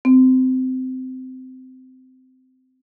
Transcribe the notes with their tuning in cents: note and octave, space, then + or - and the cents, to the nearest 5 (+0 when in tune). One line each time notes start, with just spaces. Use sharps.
C4 -20